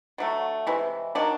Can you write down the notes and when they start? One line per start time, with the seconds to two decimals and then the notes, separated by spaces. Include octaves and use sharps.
0.18 D3 F#3 A3
0.67 C3 E3 G#3
1.15 D#3 F#3 A#3 D4